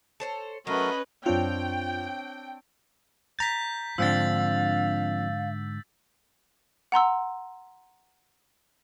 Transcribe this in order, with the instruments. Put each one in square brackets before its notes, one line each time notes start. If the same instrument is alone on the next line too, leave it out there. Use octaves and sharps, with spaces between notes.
[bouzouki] A4 C5 C#5
[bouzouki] F#3 [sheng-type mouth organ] A3 F#4 A#4 [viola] C#4 B4 [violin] D#5 B5
[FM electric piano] F#2 F4 [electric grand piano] C4 D4 C#5 [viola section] G5
[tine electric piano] A#5 A6 [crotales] G6 B6
[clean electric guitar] G#2 D3 [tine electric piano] F3 C4 D4 [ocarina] F5 [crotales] E6 A6
[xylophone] F#5 A#5 C6 E6